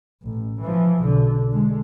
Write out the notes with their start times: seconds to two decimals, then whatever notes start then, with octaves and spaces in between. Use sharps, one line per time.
0.23 A1
0.61 E3 F3
1.00 B1 D3
1.51 D3 G#3